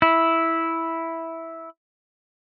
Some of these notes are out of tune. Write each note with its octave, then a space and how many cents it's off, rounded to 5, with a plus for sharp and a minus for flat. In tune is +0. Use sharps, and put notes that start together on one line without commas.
E4 -5